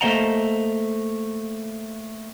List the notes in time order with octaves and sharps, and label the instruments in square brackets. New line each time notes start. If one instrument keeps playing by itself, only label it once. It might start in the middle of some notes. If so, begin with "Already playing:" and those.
[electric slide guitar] A3 A#3 C5 D#5 F#5 A#5